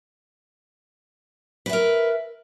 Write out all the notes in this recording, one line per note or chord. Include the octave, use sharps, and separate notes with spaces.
A#4 B4 E5